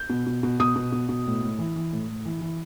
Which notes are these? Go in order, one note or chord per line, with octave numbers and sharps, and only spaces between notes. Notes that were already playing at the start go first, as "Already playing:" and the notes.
Already playing: G6
B2
B2
B2
B2 D#6
B2
B2
B2
A2
A2
E3
E3
A2
A2
E3
E3